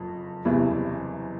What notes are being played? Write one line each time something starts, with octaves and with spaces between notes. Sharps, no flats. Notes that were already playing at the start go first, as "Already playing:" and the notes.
Already playing: F#1 F2
F#1 E2 C3 E3 G3